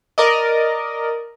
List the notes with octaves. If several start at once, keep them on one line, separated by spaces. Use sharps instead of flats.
A#4 D5 D#5